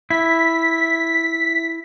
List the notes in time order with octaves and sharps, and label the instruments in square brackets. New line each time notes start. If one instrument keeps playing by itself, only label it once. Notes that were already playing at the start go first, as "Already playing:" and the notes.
[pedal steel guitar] E4 [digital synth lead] B6